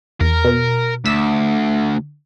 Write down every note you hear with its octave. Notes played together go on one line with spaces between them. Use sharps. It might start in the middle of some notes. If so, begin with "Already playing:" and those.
E2 A#4
B2
D2 E6 B6 E7